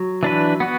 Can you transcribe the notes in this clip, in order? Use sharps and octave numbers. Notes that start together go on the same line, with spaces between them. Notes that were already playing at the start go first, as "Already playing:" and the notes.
Already playing: F#3
E3 D4 B4
B3 F#4